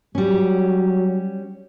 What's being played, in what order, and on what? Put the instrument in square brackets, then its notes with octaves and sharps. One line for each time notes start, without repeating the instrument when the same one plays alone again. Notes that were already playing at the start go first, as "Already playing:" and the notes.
[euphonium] F#3 [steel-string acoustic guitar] G3 C#4